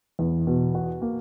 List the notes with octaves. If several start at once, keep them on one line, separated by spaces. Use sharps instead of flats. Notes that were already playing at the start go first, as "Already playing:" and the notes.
E2
B2
F#4
A#3